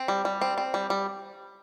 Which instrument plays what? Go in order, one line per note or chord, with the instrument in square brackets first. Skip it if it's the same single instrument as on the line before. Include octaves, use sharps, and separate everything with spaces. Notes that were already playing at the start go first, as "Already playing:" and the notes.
Already playing: [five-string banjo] C4
G3
G3
C4
C4
G3
G3